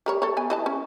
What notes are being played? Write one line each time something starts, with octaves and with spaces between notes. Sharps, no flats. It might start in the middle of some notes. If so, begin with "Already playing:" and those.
G3 A#4 C#5
A4 C#5
B3 G#5
E3 D#5 A5
C#4